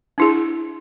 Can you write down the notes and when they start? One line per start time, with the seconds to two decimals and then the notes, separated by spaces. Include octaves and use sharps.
0.18 D4 E4 G#4